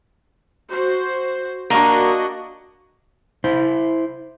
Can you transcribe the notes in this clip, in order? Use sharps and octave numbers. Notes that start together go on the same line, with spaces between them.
F#4 C5
A#3 D4 F#4 D#5
E4 C5